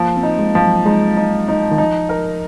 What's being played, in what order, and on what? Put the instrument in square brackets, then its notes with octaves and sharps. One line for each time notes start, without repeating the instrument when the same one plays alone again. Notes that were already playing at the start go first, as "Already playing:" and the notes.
Already playing: [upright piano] F3 [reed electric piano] A#3
[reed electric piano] C4
[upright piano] D#4
[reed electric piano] G#3
[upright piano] F3
[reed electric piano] F#3
[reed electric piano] G#3 [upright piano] D#4
[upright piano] D#4
D#4
[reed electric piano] D#3
[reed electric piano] F3 [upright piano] D#4
[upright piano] A#4